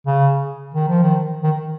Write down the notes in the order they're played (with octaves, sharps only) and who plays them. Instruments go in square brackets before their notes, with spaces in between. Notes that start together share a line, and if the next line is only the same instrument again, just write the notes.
[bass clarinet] C#3
D#3
F3
D#3
D#3